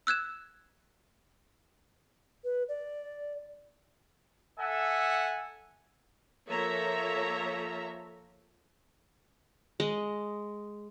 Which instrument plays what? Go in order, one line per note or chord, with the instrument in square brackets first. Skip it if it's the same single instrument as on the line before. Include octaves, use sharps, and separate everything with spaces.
[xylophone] E6 F#6 G#6 E7
[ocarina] B4
D5
[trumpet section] A4 E5 F#5 G#5
[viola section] F3 A#3 A4 C#5 E5 A#5
[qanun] G#3 D#5